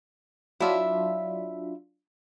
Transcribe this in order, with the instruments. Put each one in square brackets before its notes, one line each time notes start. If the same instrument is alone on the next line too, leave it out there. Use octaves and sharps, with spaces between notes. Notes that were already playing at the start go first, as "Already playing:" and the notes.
[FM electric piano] F#3 D4 F4 [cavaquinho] E4 E5